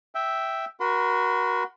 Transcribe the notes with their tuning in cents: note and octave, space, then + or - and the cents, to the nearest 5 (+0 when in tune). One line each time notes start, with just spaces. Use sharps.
E5 +0 G5 -5
F#4 +0 A#4 +30 C6 -45